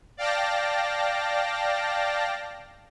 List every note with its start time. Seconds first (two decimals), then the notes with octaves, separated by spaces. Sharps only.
0.17 D5 F5 G5 A5 A#6